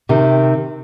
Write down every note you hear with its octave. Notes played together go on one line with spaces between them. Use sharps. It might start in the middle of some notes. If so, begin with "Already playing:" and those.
C3 D#3